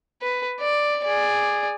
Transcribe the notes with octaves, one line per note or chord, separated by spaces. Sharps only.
B4
D5
G#4 D5